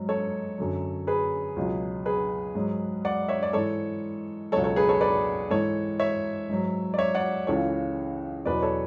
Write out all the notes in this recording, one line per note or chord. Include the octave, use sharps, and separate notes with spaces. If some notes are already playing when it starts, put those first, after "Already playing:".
Already playing: G#2 F#3
A4 C#5
F#2 D3 F#3
G#4 B4
C#2 B2 F#3
G#4 B4
G#2 F#3
D5 F#5
C#5 E5
D5
G#2 E3 A4 C#5
C#2 B2 F#3 A4 C#5
A4 C#5
G#4 B4
A4 C#5
B4 D5
G#2 E3 A4 C#5
C#5 E5
G#2 F#3
D5
C#5 E5
D5 F#5
C#2 C#3 E3 A4 C#5
E2 B2 F#3 B4 D5
A4 C#5